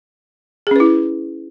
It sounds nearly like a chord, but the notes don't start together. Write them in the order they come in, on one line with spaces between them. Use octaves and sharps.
G#4 C#4 B4 E4